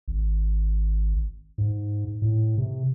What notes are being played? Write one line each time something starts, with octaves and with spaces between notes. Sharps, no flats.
G#1
G#2
A2
C3